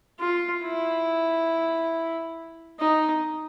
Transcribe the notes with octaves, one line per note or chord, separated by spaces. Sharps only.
F4
E4
D#4